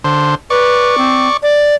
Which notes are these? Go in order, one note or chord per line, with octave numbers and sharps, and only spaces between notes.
D3 C5
B4 D5 C#6
C4
D5